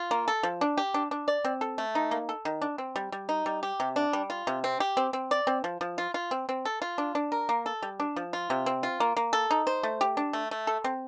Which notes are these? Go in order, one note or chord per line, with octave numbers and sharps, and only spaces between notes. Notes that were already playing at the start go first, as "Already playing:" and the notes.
Already playing: F4
A#3
A4
F3
D4
G4
D4
D4
D5
C4
A4
A3
D#4
A#3
A4
D#3
D4
C4
G3
G3
D#4
G3
G4
C3
D4
G3
F4
C3
C4
G4
C4
C4
D5
C4
F3
F3
F4
F4
C4
C4
A4
F4
D4
D4
A#4
A#3
A4
G3
D4
F3
F4
C3
C4
F4
A#3
A#3
A4
D#4
C5
A3
G4
D4
A3
A3
A4
C4